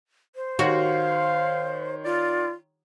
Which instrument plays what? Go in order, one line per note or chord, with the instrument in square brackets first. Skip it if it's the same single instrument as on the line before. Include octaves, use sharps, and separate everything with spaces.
[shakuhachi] C5
[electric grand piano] D#3 C#5 C6 [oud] F#4 [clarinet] F5
[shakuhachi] F4 [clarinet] D5